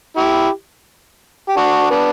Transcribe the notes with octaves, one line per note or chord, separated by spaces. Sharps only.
E4 G4
G4
D4 F#4
B3 D4